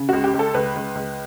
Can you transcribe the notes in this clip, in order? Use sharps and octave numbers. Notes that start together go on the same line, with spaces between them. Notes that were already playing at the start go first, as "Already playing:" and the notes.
Already playing: C#3
C#2 F#4
G4
C#2
A4
C#2 B4
C#2
C#2